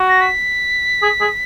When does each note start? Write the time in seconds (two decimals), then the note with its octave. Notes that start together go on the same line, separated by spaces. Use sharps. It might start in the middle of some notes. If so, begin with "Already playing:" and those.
Already playing: F#4
0.09 A#6
0.21 B6
1.03 G#4
1.21 G#4